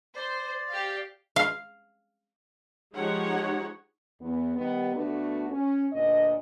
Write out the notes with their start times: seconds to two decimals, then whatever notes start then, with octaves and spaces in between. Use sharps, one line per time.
0.16 C5 D5
0.69 G4 F5
1.36 F5
2.95 F3 G#3 D#4 G4 C#5 F#5
4.21 E2 B3
4.56 D#3 G3 B3
4.94 D2 D3 A3 B3 D4 F#4
5.50 C#4
5.92 D2 A#2 D4 D5 D#5